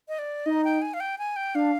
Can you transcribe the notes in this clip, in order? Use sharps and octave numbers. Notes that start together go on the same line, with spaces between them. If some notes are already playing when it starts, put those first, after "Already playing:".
D#5
D5
D#4 D#5
G5
G#5
F5
G5
G#5
G5
D4 F5